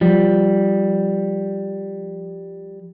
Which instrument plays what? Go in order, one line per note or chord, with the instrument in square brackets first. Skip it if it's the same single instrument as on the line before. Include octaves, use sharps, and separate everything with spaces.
[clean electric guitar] F3 G3